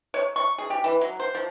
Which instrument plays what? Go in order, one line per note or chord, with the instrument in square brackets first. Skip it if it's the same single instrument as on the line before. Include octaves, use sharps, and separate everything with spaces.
[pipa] C#5
C#6
G#4
G4
E3
F#3
C5
F3